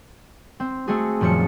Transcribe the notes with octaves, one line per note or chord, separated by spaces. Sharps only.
C4
A3 C4 F#4 G#4
D#1 F#2 F3 C#7